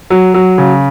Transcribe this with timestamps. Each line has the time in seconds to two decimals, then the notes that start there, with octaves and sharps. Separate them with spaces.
0.10 F#3
0.34 F#3
0.58 C#3